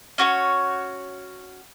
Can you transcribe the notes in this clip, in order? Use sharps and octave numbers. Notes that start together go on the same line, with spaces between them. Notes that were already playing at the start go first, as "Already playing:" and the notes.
C#4 F#4 B4 C#5